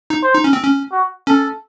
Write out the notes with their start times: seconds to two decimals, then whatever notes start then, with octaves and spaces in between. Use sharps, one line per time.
0.10 D#4
0.23 C5
0.34 D#4
0.44 C#4
0.53 C4
0.63 C#4
0.92 F#4
1.27 C#4 A4